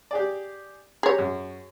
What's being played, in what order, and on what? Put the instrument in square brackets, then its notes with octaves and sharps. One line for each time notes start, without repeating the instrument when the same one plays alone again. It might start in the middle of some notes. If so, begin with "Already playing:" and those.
[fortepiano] G4 G#4 D5
[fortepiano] G4 A#5 [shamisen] G#4 C#5
[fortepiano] F#2